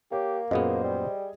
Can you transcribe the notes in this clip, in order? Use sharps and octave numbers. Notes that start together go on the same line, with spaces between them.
A#3 G4 C#5
F#2 A#2 B3 G#4 C5 D#5
G3